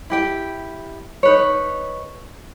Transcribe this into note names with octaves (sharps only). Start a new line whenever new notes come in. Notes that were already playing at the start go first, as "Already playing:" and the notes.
E4 G4 G5
D#4 B4 C#5